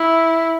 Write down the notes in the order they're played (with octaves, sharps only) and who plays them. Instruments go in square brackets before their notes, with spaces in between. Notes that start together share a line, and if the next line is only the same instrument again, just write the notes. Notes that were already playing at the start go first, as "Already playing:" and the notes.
Already playing: [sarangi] E4